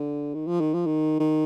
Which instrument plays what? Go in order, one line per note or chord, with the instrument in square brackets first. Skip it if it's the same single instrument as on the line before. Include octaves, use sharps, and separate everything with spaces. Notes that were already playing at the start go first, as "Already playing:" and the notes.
Already playing: [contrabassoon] D3
D#3
F3
D#3
F3
D#3
D#3